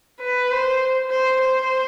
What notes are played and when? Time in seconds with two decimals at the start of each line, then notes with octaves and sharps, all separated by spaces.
0.20 B4
0.51 C5
1.10 C5
1.41 C5